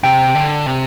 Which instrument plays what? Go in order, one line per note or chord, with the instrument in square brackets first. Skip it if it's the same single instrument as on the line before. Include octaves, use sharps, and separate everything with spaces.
[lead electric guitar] C3 [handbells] G5
[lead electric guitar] D3
C3